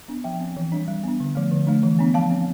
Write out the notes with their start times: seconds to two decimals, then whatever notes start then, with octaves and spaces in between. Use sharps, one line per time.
0.08 B3 D4
0.24 F3 E5 G5
0.40 C4
0.57 E3
0.72 G3 D4
0.88 G3
1.04 B3 D4
1.20 D3
1.35 F3 A3
1.51 D3
1.67 A3 D4
1.83 E3
1.99 B3 D4
2.14 F3 F5 A5
2.30 C4